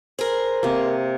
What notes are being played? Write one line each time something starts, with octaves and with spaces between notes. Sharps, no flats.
G#4 A#4 C5
C3 A#3